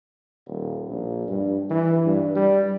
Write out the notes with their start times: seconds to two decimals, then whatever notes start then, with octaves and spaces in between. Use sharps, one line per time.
0.47 D#1
0.89 A#1
1.28 G2
1.70 E3
2.06 G2
2.36 G3